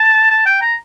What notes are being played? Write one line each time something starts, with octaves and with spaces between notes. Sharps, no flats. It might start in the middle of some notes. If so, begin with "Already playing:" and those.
Already playing: A5
A5
G5
A#5